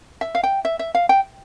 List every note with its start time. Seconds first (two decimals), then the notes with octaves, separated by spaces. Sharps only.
0.21 E5
0.35 F5
0.43 G5
0.65 E5
0.79 E5
0.95 F5
1.09 G5